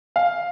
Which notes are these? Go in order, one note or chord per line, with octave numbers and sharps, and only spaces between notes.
F5